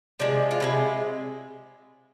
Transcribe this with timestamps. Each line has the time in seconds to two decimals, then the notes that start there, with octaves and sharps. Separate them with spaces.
0.20 C3 F3 G#3 D4
0.51 F4
0.60 C3 F3 G#3 E4